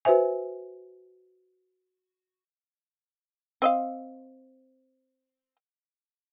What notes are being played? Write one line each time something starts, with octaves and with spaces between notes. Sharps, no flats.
F#4 B4 C5 E5 G#5
C4 D#5 F5